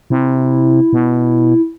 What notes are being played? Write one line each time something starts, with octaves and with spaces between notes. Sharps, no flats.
C3 E4
B2